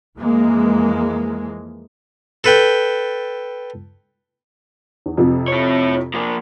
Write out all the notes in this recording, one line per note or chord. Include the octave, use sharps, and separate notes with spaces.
F2 E3 G#3 A#3
A4 B4 G5
E2
F2 C3 F3
E4 C#5
F3 A#3